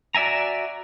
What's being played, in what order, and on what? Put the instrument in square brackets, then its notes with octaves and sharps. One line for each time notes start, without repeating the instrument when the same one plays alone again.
[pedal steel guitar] F#4 D5 E5 G#5 A#5